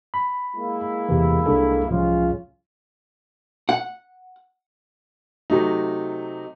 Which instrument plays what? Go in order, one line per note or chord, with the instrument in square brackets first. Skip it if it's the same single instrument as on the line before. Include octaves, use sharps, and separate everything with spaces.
[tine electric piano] B5
[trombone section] G#3 A#3 E4
[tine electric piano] E2 C3 E3
C2 D4 A4
[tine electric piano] C2 A2 F3 [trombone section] G#3 C#4 F4
[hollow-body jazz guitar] F#5
[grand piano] C3 F#3 A3 D#4